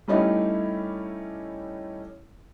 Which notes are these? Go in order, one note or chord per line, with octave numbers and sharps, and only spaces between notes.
G3 A3 C#4 D#4 E4 G4